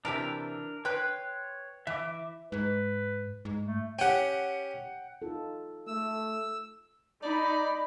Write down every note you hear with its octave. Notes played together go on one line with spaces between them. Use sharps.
C3 E3 D4 G4 A#4
B4 C#5 G5 C6 F#6
E3 E5 D6
G#2 B4
G#2
A3
C#4 G4 F#5 G5
D#4 F4 A4
A3 E6
D#4 D5 B5